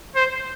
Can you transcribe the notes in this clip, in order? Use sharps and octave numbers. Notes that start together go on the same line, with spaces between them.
C5